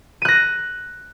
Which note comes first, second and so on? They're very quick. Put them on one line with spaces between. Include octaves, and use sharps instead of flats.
D#7 F#6 A#6